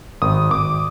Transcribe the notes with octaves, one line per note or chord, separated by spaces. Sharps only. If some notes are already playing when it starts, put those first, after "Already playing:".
G#1 D#6
G#1 D6